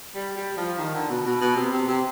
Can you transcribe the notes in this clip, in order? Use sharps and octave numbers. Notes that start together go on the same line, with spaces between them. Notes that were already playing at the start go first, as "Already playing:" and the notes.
G3
G3
F3
D#3
D3
B2
B2
B2
C3
C3
C3